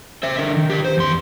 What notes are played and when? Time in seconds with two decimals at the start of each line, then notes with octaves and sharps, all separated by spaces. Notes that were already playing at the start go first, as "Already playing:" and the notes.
0.23 C5 E5
0.38 D3 A#4
0.57 D#3
0.70 G4 B4
0.85 C5
0.97 E2 C6